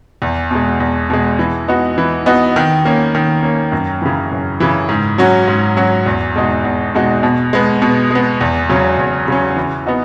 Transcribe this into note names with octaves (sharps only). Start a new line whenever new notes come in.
E2
B2 G#3
E2
B2 G#3
E3
B3 D#4 F#4
E3
B3 D#4 F#4
D#3
A#3 C#4
D#3
A#3 C#4
F#2
C#3 E3
F#2
C#3 E3
G#2
F#3 C#4 F#4
G#2
F#3 C#4 F#4
E2
B2 G#3 D#4 F#4
E2
B2 G#3 D#4 F#4
B2
G#3 B3
B2
G#3 B3
E2
C#3 F#3 C#4
E2
C#3 F#3 C#4
E3
B3 D#4 F#4